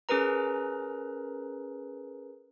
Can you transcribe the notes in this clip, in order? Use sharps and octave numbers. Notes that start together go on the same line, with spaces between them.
C#4 G#4 A#4 B4 A#5